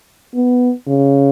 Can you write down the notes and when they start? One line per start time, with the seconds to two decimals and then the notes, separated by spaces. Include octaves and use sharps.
0.35 B3
0.88 C#3